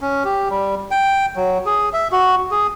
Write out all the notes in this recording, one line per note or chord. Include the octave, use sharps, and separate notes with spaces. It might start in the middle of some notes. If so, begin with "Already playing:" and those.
C#4
G4
G3
G5
F#3
G#4
E5
F#4
G#4